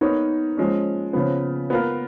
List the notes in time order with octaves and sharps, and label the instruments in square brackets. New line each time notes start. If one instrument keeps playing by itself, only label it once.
[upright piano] B3 D#4 A#4 C#5
F3 G#3 C#4
C#3 F3 B3
B3 F4 A#4